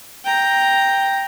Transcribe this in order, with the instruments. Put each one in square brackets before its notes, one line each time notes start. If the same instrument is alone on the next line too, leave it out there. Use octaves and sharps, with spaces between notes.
[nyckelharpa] G5 A#5